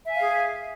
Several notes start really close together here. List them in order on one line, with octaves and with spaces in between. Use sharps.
E5 G#5 F5 G#4